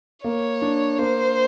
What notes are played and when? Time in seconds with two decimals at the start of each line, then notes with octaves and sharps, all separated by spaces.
0.24 A#3 C#5
0.62 D4
0.98 A#3 C5